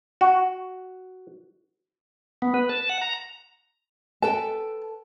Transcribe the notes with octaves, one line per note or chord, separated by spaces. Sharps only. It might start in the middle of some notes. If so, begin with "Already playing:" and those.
F#4
B3
B4
A5
F#5
A#5
A4 B4 G5 A5